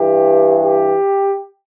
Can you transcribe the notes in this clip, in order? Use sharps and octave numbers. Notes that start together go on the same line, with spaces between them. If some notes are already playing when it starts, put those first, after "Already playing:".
Already playing: G2 E3 G4
G4